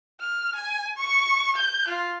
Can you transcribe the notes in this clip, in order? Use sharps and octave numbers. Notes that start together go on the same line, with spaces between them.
F6
G#5
C#6
G6
F4